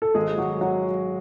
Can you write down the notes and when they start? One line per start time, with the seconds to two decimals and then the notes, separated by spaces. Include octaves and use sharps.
0.02 A4
0.14 G#1 G#3 G#4
0.38 G#1 F#3 F#4
0.61 F#3 F#4